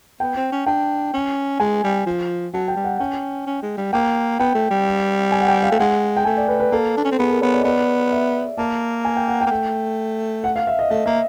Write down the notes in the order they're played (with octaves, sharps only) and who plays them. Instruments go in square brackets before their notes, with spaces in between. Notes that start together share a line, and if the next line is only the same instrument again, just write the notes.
[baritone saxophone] B3 [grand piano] G5
[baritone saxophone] C4
C#4
[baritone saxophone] D4 [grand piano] G5
[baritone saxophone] C#4
[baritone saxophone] G#3 [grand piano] G#5
[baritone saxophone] G3
F3
[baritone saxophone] F#3 [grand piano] A5
[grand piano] G5
[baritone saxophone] G3
[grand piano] F#5
[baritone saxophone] C#4 [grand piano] G5
[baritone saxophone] C#4
G#3
G3
[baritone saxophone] A#3 [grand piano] G5
[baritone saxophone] B3 [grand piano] G5
[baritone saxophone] A3
G3
[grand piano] G#5
F#5
G5
F5
[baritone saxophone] A3
[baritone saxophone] G#3 [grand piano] F#5
[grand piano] G5
[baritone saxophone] A3 [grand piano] G#5
[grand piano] D5
[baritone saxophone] A3 [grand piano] B4
[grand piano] B4
[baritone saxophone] A#3 [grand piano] A4
[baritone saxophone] D4
C#4
C4
[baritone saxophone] B3 [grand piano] G#4
[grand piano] A#4
[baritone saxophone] B3 [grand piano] C#5
[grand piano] D5
D#5
[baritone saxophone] B3 [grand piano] D5
[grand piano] E5
[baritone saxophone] A#3 [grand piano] A5
[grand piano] G#5
G5
F#5
G5
[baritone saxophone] A#3
A3
[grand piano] F#5
F5
E5
D#5
[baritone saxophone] A3 [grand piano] D#5
[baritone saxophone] A#3 [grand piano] E5